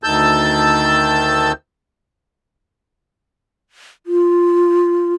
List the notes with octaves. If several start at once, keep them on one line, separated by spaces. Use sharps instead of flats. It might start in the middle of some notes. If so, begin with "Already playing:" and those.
D2 D#3 A5 E6 G6
F4